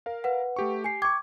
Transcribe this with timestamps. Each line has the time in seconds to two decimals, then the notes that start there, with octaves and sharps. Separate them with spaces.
0.06 A#4 F5
0.24 B4 F#5
0.56 A3 G4 C#6
0.84 G4 G#5 C7
1.02 G5 C#6 D6 G#6